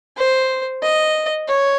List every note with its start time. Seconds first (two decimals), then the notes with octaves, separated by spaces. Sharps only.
0.17 C5
0.83 D#5
1.48 C#5